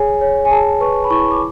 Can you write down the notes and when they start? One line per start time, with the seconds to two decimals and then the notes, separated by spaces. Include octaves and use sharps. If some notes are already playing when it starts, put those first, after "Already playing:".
Already playing: G#4 C#5 G#5
0.21 C#5
0.45 G#5
0.51 G#4 A5
0.80 B4 C#6
1.04 B5
1.10 E4 C#6
1.31 D6